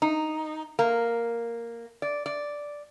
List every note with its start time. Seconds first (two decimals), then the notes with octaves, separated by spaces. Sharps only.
0.02 D#4
0.79 A#3
2.02 D5
2.26 D5